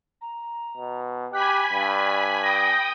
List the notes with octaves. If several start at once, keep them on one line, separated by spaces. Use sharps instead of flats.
A#5
B2
G4 G#5 B5 F#6 B6
G2 D5
G5 D#6 A#6